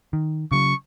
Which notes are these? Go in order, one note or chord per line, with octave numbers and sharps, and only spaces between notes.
D#3
C#3 F#3 C#6